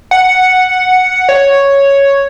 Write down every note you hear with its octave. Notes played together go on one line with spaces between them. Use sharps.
F#5
C#5